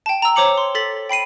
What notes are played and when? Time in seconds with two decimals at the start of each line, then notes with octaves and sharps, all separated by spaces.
0.06 G5 A5
0.22 A#5 E6
0.36 C5 C#5 A#5 D6 C#7 F#7
0.58 C6
0.75 A4 A6 B6 F#7
1.09 G5 B5 C7 D#7